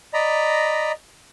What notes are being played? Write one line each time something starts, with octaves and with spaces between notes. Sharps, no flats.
D5 D#5 A#5 B5